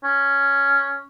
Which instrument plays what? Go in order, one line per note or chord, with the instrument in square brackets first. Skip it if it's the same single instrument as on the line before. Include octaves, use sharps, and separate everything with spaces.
[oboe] C#4